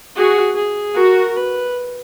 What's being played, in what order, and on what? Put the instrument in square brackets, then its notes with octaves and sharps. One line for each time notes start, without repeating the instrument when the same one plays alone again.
[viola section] F#4 [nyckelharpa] G#4
[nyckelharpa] G#4
[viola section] F#4 [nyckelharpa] A#4
[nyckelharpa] B4